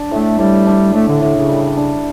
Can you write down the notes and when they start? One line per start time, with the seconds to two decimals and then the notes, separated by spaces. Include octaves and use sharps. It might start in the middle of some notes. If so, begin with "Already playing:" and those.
Already playing: D4
0.11 A2 A3
0.39 A2 G3
0.67 D4
0.94 A2 A3
1.08 D3
1.21 A2 D3
1.36 C#3
1.49 G3
1.77 D4